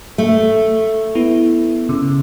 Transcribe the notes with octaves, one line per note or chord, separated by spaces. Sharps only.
A3
B3 E4
C#3